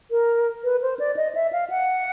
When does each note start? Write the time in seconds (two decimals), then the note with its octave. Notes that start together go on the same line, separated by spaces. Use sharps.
0.11 A#4
0.64 B4
0.82 C5
0.99 D5
1.16 D#5
1.35 E5
1.52 F5
1.70 F#5